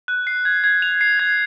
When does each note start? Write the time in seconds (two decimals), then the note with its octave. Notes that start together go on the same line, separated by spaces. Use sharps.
0.08 F#6
0.27 C7
0.45 G#6
0.64 G#6
0.82 F7
1.01 C7
1.19 G#6